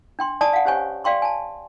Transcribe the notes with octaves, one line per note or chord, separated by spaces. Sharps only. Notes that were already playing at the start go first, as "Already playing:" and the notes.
D4 G5 C6
D5 G#5 A5 D#6
F5 F#5
C#4 G4 C5 C#5 G#5 C#6
D5 F5 G5 C6 C#6
G#5 A5